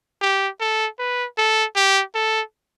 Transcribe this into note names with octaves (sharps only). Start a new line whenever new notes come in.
G4
A4
B4
A4
G4
A4